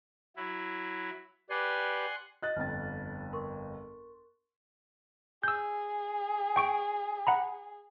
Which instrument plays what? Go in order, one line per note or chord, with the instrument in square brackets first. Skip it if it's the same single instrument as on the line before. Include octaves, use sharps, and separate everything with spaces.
[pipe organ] F#3 E4
[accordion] G4 B4 D5 [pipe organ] F#5 G#5 C6
[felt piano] D#5 F#6 A6
[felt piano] G1 F2 [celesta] F6 A6
[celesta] A#4 C6 C#6
[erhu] G#4 [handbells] E6 G6
[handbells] G5 C#6 D7
F#5 A#5 B5